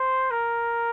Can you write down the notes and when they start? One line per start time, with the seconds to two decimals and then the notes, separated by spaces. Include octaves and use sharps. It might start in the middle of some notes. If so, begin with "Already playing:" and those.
Already playing: C5
0.30 A#4